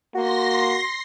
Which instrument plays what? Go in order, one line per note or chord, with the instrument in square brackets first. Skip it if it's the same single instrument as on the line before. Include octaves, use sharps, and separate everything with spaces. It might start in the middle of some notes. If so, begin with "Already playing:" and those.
[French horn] A#3 [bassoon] F#4 [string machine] C6 A#6 C7